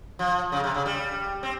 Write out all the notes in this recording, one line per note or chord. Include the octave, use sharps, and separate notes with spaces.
F3
C#3
C3
C#3
G3
C4